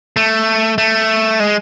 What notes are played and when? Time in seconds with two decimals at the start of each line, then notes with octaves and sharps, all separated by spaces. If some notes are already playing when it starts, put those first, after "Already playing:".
0.16 A3
0.78 A3
1.40 G#3